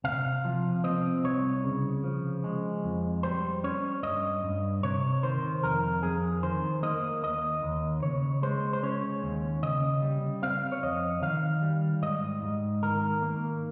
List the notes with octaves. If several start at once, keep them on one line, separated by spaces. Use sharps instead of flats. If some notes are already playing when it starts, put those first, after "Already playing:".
C3 F5
F3
C4 D#5
C2 C#5
C#3
F3
G#3
F2
G3 C5
C#4 C#5
G2 D#5
G2
C3 C#5
D#3 C5
F2 A#4
F2 G#4
D#3 C5
A#3 D#5
D#2 D#5
D#2
C#3 C#5
G#3 C5
C5
C#4 C#5
D#2
C#3 D#5
G3
C4 F5
C#5
F2 D#5
D#3 F5
G3
G#2 D#5
G#2
D#3 A#4
A#3